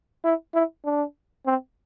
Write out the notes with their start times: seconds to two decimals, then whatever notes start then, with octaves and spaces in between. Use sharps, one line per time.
0.24 E4
0.54 E4
0.85 D4
1.46 C4